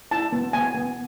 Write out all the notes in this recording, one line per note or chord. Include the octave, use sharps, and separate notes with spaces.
E4 A5
B3
B3 G#5
B3